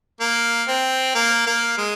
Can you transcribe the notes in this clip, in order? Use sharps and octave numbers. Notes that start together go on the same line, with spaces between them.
A#3
C4
A#3
A#3
G#3